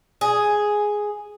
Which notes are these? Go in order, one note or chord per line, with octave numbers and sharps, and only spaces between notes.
G#4